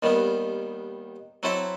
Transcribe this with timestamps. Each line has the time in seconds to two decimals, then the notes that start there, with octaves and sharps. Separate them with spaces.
0.03 D#2 D#3 G3 B3
1.43 F#3 C4 E4 A4 E5